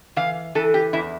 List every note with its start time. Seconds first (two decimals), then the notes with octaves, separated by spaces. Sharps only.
0.16 E3 F5
0.55 E3 A4
0.74 G4
0.93 E2 E4